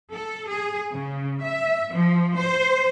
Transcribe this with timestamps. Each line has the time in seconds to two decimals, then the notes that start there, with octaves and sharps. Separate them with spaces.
0.13 A4
0.49 G#4
0.93 C#3
1.42 E5
1.93 F3
2.38 C5